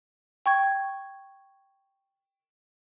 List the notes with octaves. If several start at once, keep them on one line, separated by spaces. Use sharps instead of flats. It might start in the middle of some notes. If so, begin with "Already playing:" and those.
G5 C#6 G#6